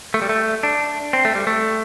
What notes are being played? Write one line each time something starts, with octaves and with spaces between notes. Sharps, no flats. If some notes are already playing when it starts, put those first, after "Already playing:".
A3
G3
A3
D4
C4
A3
G3
A3